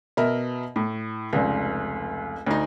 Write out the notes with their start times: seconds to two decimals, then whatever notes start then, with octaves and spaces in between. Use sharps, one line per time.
0.17 B2 A#4 E5
0.76 A2
1.33 F1 C#2
2.46 D2 D#4